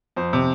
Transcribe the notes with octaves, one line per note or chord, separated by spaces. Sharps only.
F2 C5
C3